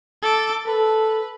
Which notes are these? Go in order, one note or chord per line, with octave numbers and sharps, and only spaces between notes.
A4 D6
A4 B4